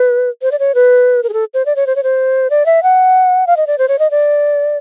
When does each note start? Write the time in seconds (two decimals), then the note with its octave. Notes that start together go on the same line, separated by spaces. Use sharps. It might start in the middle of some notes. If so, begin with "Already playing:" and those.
Already playing: B4
0.42 C5
0.52 D5
0.59 C#5
0.75 B4
1.23 A#4
1.29 G#4
1.33 A4
1.54 C5
1.66 D5
1.76 C#5
1.87 C5
1.96 C#5
2.03 C5
2.50 D5
2.66 E5
2.83 F#5
3.47 F5
3.57 D#5
3.67 D5
3.78 C5
3.88 C#5
3.99 D#5
4.11 D5